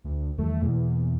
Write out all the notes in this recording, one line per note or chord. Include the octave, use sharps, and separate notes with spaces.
D2
E2 D#3 G3 A3
E2 B2 E3 A#3